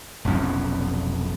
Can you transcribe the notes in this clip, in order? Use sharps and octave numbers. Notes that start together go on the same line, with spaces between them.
F1 B1 F2 C#4